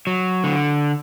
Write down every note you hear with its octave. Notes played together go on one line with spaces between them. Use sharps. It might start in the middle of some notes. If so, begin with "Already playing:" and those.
F#3
D3